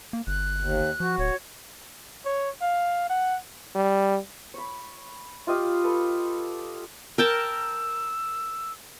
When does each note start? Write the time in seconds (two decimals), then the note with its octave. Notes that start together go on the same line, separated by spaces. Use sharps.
0.13 A#3
0.27 G1 F#6
0.56 D#2
1.00 F3 F#4
1.18 D1 C#5
2.25 C#5
2.61 F5
3.10 F#5
3.75 G3
4.54 C#5 B5
5.47 F4 G4 D#5 F5
5.84 A4 B4 B5
7.18 A#4 G5 A5 E6